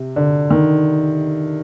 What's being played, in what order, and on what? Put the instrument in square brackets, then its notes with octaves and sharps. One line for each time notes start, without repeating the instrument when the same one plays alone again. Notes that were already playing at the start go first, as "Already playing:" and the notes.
Already playing: [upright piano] C3
D3
D#3